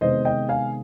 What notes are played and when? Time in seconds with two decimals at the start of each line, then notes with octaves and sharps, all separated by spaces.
0.01 C3 D#3 G#3 B3 C5 D#5
0.25 D#5 G5
0.49 F5 G#5